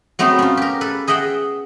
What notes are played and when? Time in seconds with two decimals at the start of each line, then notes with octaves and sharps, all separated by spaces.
0.19 F#3 A3 B3 C4 D#4
0.39 C#4 F4
0.57 G4 A#4
0.81 A4 B4
1.08 G#4 D#5 E5 F#5 G5